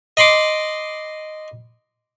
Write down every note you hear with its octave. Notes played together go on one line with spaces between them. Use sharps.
D#5 B5 C6 D6